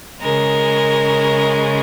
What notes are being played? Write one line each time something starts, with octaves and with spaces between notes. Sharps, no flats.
C#3 G#3 A#4